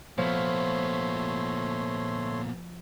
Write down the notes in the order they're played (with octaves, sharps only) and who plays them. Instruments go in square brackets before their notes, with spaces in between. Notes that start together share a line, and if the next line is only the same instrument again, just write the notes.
[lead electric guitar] A#2 B3 [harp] F3 [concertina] A3 C#5 C6